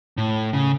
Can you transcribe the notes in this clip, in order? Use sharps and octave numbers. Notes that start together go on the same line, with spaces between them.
A2
C#3